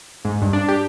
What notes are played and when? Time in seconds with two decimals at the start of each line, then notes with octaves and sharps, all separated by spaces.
0.25 G#2
0.42 G2
0.53 D4
0.68 G4